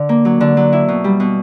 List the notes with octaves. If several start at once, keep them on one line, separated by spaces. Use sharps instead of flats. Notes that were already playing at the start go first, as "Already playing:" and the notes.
Already playing: D3
A#3
F#3
D3
F#3
E4
B2
G3
B2